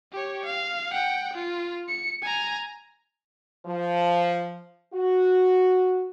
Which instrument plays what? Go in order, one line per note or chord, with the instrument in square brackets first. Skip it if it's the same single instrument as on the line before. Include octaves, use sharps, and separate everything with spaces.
[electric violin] G4 C#5
F5
F#5 G5
F4
C#7
G#5 A#5
[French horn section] F3
F#4